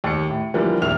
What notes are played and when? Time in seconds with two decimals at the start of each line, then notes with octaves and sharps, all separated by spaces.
0.04 D#2 C#7
0.30 A2
0.54 D3 E3 F3 G3 A#3
0.82 A#1 D#2 A#3 E5 F6 F7